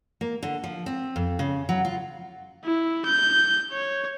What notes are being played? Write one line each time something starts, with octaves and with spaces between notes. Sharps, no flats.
A#3
D3
F3
C4
F2
C#3
F#3
F4
E4
G6
C#5